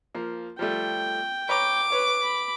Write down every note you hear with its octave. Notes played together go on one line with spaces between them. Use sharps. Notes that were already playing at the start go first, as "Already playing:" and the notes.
F3 A#3
F3 G3 A3 G5
B4 C#5 A#5 D6
B4 C#5
B5